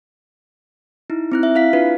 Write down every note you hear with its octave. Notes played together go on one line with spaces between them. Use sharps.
D#4 E4
C4 E4 F#6
E5
E4 F5 B6
D4 E4 F4 B4